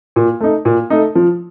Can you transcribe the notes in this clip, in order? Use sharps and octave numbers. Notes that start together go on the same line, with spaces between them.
A#2
A3 D#4
A#2
A3 D#4
F3